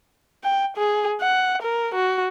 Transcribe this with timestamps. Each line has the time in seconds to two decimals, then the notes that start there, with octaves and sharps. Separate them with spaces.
0.44 G5
0.77 G#4
1.21 F#5
1.62 A#4
1.94 F#4